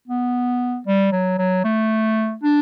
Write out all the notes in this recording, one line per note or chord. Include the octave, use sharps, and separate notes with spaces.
B3
G3
F#3
F#3
A3
D4